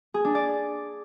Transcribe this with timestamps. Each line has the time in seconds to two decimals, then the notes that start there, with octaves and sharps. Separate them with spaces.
0.14 G#4
0.25 D4
0.35 D5